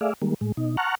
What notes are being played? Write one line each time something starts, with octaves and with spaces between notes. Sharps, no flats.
A3 G#4 D5 E5 F5
D#3 G3 G#3 A#3
A2 G#3
B2 D#4
F#5 A5 A#5 C#6 F6 F#6